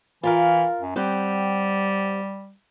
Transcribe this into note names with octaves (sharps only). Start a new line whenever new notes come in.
E3 F4 A#4 F5
F#2
G3 C4 G4 F#5